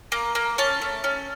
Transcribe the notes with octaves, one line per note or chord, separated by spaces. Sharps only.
A#3
A#3
C#4 A5
A3
C#4